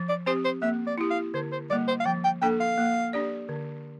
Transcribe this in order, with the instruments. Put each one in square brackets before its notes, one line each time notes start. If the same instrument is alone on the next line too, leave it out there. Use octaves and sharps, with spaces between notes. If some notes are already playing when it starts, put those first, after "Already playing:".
Already playing: [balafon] F3
[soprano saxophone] D5
[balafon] C4 G4 [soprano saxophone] C5
[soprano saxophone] C5
[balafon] A#3 [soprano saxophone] E5
[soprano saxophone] D5
[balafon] E4 G4
[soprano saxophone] F5
[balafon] D3 [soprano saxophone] C5
[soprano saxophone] C5
[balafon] G3 A#3 [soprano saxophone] D5
[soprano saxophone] C5
F5
[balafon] F3 [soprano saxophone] G5
[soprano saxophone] G5
[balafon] A#3 D4 A4 [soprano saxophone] G5
[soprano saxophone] F5
[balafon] A#3
D4 G4 D5
D3